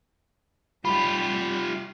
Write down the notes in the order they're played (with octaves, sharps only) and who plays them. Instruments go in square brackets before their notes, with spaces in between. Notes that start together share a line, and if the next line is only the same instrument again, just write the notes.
[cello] G3 [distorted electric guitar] F4 G4 [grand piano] B5